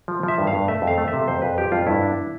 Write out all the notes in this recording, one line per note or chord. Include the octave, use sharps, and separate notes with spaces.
F3
F3 E5
G2
F5
G2
A3 E5
F2
F5
A3
E5
C3
F2 C5
F2 B4
F3 G4
F2 F4
G2 E4
D4